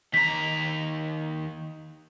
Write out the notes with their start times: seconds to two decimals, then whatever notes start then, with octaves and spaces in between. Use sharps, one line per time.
0.14 D#2 A#5 B6